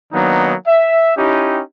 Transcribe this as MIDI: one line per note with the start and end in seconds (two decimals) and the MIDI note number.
0.13 0.54 51
0.13 0.54 54
0.13 0.54 58
0.13 0.54 59
0.13 0.54 62
0.13 0.54 63
0.67 1.13 76
1.17 1.61 61
1.17 1.61 63
1.17 1.61 64
1.17 1.61 67